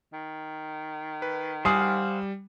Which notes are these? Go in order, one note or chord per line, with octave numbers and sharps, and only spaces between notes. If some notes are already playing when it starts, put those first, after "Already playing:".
D#3
B4
G3 C5 F5 F#5 G#5 D#6